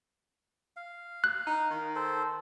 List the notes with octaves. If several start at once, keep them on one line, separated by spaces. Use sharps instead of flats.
F5
F#6
D#4
D#3
A4 C5